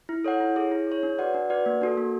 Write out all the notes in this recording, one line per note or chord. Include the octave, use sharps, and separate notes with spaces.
E4
A4 C#5 F#5
E4
G#4 C#5
E4
G#4 C#5
D4
F#4 B4 D5 F#5
D4
F#4 B4 D5 F#5
A#3
D4 F#4 A4
A#3